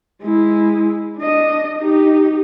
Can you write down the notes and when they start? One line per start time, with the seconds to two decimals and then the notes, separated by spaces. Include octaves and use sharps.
0.22 G#3 E4
1.18 D4 D#5
1.79 D#4 G4